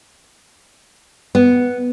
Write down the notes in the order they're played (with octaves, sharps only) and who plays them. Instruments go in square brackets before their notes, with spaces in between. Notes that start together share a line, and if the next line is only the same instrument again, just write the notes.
[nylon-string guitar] B3